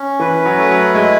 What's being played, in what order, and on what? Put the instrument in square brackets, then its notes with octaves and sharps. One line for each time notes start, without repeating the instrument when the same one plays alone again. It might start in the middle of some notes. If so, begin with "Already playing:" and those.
Already playing: [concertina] C#4
[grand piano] E3 [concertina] B4
[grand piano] F#3
[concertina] A3
[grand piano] F#3
[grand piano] G#3 [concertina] E4